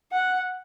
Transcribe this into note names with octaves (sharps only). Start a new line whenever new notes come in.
F#5